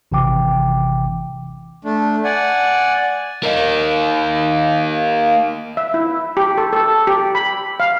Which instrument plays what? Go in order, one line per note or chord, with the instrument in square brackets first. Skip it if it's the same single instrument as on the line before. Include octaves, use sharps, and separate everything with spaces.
[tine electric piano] G#1 C3 E3 G5 D6
[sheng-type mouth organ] A3 D4
D5 F#5 G#5
[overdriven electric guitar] A#3 D#4
[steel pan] E5
E4
G4
A4
A4
G4
B5
F5